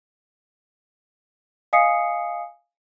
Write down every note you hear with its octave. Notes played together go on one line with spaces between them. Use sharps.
D#5 F5 G#5 D#6 C7 C#7